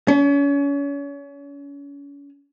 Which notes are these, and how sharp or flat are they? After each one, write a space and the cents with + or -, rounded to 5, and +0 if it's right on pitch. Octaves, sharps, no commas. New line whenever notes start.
C#4 +35